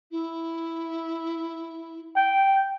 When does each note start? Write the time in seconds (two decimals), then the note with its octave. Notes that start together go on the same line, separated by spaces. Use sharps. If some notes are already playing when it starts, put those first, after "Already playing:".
0.11 E4
2.16 G5